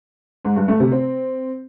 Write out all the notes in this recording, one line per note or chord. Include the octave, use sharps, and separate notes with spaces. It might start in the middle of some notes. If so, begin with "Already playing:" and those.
G#2
G2
A3
C3
C4